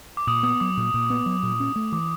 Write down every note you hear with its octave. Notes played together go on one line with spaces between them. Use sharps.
D6
A#2 D#6
B3 D#6
F#3 D6
A#2
A#2
B3
F#3
A#2
C#4
A3
E3 D6